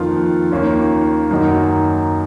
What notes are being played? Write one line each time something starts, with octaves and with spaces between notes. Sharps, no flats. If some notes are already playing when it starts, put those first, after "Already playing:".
Already playing: F2 D#3 A#3 F4
D#2 D#3 A#3 C#4 F4
F#2 D#3 A#3 D#4 F#4